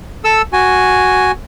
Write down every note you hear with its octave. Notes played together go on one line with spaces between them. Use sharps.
A4 E6
F#4 G#5